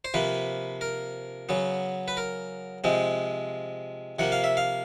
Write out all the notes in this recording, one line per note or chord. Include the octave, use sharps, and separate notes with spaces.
C5
C3 F3 A#3 B4
A#4
C#3 F#3 B3
B4
A#4
C3 F3 G#3 C4
C3 F3 A#3 F#5
F5
E5
F5